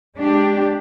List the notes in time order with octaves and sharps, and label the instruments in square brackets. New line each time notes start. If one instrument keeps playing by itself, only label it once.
[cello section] G#3 D4 G4